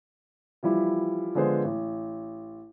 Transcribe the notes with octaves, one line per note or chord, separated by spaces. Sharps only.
E3 F3 G3 E4
D3 F3 G#3 B3 G#4 C5
A1